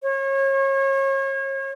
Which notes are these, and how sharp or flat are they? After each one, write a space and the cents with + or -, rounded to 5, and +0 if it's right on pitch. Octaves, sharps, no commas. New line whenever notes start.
C#5 -35